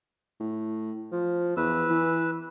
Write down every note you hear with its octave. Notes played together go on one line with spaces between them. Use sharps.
A2
F3
E2 B4 E6
E3